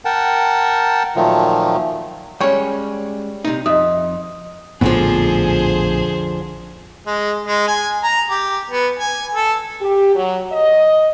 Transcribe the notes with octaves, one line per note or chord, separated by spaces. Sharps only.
A#4 F#5 G5 A5
A#2 D#3 F3 F#3 A3
G3 G#3 C#4 C#5
C3 D#4
F2 D#5 E5 D#6
A#1 F2 A2 D3 F3 B3 G#4 C5
G#3
G#3
G#5
A#5
G4
B3
G#5
A4
G4
F#3
D#5